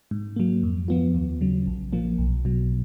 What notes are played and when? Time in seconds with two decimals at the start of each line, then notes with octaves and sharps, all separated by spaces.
0.11 G#2
0.36 F#3 A#3
0.63 F2
0.88 F3 B3 F4
1.15 D#2
1.41 C#3 F#3
1.67 A#1
1.93 A#2 F3 A#3
2.18 B1
2.45 B2 F#3